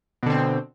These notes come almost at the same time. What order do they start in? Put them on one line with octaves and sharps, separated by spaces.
B2 D3 C4